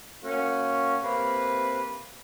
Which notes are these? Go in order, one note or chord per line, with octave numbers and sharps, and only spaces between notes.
A#3 C#4 F#4
C3 A#3 B4